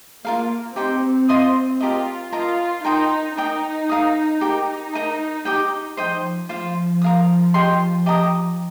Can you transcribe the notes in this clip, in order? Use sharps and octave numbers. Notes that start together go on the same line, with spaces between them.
A#3 F4 A#4 F5
C4 D#4 G4 C5
F4 D#5 C6 D#6
F4 G4 A#4 D#5
F4 A#4 D#5 A#5
D#4 A#4 G5 C6 D#6
D#4 A#4 G5 A#5 D#6
A#4 F5 D#6
D#4 G4 A#4 G5
A#4 D#5 A#5
G4 D#5 G5
F3 C5 D#5 G5 D#6
F3 F4 C5 F5
A#4 F5 D#6
G4 D#5 G5 C6
G4 D#5 A#5 D#6